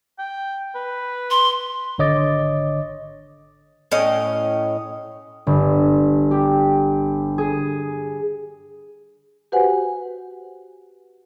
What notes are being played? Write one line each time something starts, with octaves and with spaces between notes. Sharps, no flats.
G5
B4
C6
G#1 D3 C#5 D#5 D6 A6
A2 C#4 D#5
G1
G4
G#4
F#4 G4 B4 C5 F#5 G#5